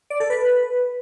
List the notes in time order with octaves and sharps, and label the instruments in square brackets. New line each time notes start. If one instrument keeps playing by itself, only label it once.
[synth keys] D5
A4
B4